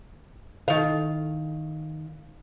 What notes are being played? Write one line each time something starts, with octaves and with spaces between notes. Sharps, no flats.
D#3 F5